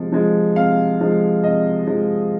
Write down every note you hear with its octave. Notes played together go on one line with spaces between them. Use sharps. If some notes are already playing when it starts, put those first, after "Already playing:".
Already playing: C3 F3 G#3
F3 G#3
C3 F5
F3 G#3
C3 D#5
F3 G#3